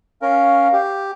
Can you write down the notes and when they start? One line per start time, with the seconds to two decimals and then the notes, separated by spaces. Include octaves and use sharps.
0.22 C#4 A#4 F5
0.73 G4